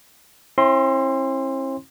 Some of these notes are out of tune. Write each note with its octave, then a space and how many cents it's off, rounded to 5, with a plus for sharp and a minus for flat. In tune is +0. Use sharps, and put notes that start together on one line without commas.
C4 +45 E4 +0 C6 +0